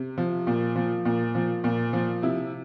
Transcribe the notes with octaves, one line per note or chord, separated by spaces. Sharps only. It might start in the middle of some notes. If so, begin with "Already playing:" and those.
Already playing: C3
F3
A#2
F3
A#2
F3
A#2
F3
C3 E4